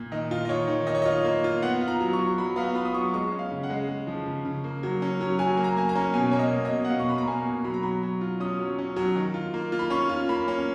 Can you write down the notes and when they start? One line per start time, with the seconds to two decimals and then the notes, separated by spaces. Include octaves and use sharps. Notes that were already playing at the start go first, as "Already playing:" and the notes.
Already playing: A#2
0.12 D#3 D#5
0.31 F4
0.45 D#5
0.49 D#3 C#5
0.68 D#3
0.87 D#3 D#5
0.95 C#5
1.02 D#5
1.06 F4
1.24 A#3
1.44 F4
1.62 B3 F#5
1.81 F4
1.88 A#5
2.00 F#3
2.13 C#6
2.19 F#3
2.38 F#3 B5
2.56 B3 F5
2.75 F4 B5
2.85 D#6
2.94 F#3 C#6
3.14 G#3 C#6
3.32 C#4
3.39 F5
3.51 C#3
3.63 F#5
3.70 G#3
3.89 G#3
4.07 F3
4.26 C#3
4.45 C#3
4.64 A#3
4.83 F#3
5.02 C#4
5.21 F#3
5.39 F#3 G#5
5.57 A#3
5.64 A#5
5.77 A#3 G#5
5.89 A#5
5.95 C#4
6.14 B2 G#5
6.32 A#3 C#5
6.39 D#5
6.52 B2
6.65 D#5
6.71 B2
6.85 F#5
6.90 B2 F5
7.00 C#6
7.09 B2 B5
7.18 A#5
7.27 A#3 G#5
7.46 B2
7.64 F#3 B5
7.74 A#5
7.83 F#3 B5
8.03 F#3
8.21 F4
8.40 C#4 D#6
8.59 F#3
8.78 C#4
8.96 F#3
9.16 D#3
9.34 F4
9.54 A#3
9.72 F4
9.79 B5
9.90 C#4 C#6
10.09 F4
10.29 A#3 B5
10.48 C#4